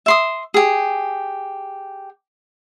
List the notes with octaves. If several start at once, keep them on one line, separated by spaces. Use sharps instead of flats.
E5 C6 D#6
G4 G#4